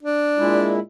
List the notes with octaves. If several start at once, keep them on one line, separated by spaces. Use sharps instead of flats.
D4
A#2 G#3 E4